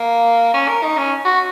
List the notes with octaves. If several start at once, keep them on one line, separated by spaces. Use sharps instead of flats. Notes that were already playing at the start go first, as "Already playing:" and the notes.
Already playing: A#3
C#4
A#4
D#4
C#4
F#4